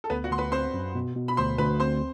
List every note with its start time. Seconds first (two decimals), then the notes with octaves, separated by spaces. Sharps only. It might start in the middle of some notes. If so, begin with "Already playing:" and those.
0.04 A4
0.10 D2 B3 B4
0.24 F#4 F#5
0.31 D2 C6
0.38 B4 B5
0.52 C4 C5 C6
0.74 F#2
0.95 B2
1.16 B2
1.28 B5
1.37 D2 C5 C6
1.58 D2 B4 B5
1.80 C4 C5 C6